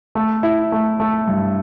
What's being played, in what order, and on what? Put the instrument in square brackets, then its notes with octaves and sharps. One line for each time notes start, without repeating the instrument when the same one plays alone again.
[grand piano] A3
E4
A3
A3
G2